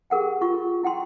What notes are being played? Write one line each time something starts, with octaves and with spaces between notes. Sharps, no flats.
G4 G#4 A#4 F#5 G5
F4 C#6
E4 F#5 G5 C6